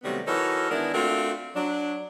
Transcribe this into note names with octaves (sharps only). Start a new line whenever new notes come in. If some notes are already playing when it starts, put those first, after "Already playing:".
C3 D#3 F#3 G3 A3 B3
E3 D#4 F#4 A4 A#4 C#5
D#3 G#3 B3 D4 E4 A#4
A3 C4 D4 F4 F#4 A#4
F#3 D4